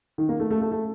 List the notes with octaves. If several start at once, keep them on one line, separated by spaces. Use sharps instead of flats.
D#3
A#3
A3
A3
A3
A3